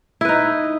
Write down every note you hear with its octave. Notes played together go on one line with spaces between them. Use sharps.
D#4 E4 B4